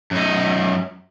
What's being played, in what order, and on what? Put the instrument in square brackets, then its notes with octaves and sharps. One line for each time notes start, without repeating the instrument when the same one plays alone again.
[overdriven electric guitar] F#2 D#4